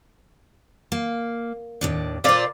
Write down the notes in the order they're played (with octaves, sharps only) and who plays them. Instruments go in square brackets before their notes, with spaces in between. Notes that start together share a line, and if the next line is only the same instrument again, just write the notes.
[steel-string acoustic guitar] A#3
D#2 A2 D4
[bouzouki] A#2 F4 D5 [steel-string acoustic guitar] C5 F5